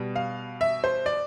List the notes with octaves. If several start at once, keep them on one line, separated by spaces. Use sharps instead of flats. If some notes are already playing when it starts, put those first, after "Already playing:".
Already playing: B2 G3
F5
E5
C5
D5